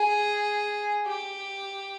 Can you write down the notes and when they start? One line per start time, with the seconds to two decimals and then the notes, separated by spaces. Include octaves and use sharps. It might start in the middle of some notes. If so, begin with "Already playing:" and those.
Already playing: G#4
1.06 G4